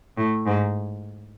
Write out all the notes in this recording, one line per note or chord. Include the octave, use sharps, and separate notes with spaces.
A2
G#2